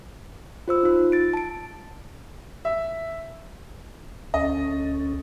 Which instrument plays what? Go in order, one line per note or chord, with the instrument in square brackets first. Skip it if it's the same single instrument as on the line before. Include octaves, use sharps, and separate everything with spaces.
[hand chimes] F4 C5 E6
D#4 F4
A6 D7
A5 D7
[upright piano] E5
[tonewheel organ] D2 C#4 A4 [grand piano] D#5